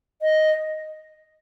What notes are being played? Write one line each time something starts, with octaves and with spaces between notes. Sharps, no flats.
D#5